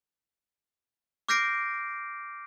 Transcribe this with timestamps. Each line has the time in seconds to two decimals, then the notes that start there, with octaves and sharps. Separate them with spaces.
1.29 D6 F6 G6 A#6 C7 D7